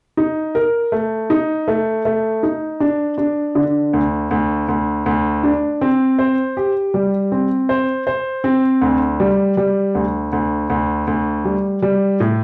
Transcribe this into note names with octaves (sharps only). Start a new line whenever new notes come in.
D#4
A#4
A3
D#4
A3
A3
D#4
D4
D4
D3
D2
D2
D2
D2
D4
C4
C5
G4
G3
C4
C5
C5
C4
D2
G3
G3
D2
D2
D2
D2
G3
G3
A2